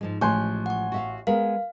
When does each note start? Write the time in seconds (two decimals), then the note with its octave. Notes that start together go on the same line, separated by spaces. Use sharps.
0.01 G#2 F3 G#3
0.21 A1 F3 G#3 G#5 C6 C#6 F#6 G6
0.66 F#5 C#6
0.92 F#4 E5 F5
1.27 G#3 B3 G#4 A#4 F5